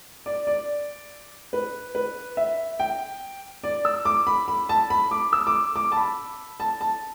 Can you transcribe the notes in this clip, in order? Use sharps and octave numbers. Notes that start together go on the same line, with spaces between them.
D5
D5
B4
B4
E5
G5
D5
E6
D6
B5
B5
A5
B5
D6
E6
D6
D6
A5
B5
A5
A5